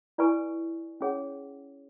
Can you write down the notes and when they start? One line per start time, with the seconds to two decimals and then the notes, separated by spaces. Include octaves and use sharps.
0.18 E4 B4 D5 G#5 C#6
1.01 C#4 G#4 C#5 F#5